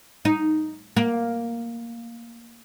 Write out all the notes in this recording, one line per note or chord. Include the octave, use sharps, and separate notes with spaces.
D#4
A#3